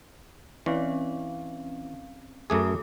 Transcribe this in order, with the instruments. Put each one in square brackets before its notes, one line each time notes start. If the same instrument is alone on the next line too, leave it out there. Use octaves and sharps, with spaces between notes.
[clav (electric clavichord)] E3 [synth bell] C4 C#4 F5
[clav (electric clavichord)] F#2 A3 G#4 [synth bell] A4 D6